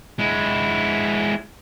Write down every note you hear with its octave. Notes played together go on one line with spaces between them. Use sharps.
G#3 E4